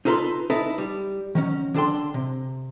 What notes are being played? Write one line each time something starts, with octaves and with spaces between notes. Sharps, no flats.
D#4 F4 A4 B4 A#5 C6
D#4 E4 A4 B4
G3
D#3 F#3 C#4
D3 D4 A4 G5 C6
C3